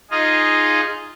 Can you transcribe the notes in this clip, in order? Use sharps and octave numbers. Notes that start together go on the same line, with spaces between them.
D#4 F4 G#4 D#5